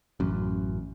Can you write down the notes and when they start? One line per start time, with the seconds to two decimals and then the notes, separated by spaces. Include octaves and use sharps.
0.20 A1 F#2